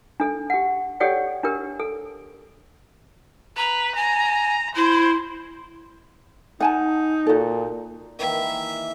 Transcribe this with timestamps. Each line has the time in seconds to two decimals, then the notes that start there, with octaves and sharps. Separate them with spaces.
0.20 D4 A4
0.50 G4 F#5
1.00 G4 A4 C#5 D5 F#5 G5
1.43 D4 G4 A#4
1.80 A4
3.57 B4 A#5
3.95 G#5 A#5
4.75 E4 C5
6.60 D#4 F#5 G#5 A5
7.27 A#2 F#4 A4
8.19 D#3 E3 A#3 E5